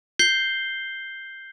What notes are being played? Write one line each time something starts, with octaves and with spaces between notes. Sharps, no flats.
G6 C7 G7